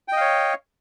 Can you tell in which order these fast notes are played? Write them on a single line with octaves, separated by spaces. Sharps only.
G5 D#5 F5 C#5